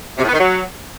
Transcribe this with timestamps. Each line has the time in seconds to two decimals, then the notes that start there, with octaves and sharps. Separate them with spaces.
0.18 C3
0.23 A2
0.28 B3
0.33 D#3
0.39 F#3